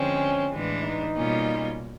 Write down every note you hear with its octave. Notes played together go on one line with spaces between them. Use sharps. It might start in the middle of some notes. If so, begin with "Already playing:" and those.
Already playing: D3 F3 G#3 C4 C#4
A2 E3 G#3 B3 D4
D#4
B2 G3 A#3 C#4 F4